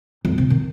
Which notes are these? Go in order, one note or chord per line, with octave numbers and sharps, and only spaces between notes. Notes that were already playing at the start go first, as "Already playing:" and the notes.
F2
C3
D#3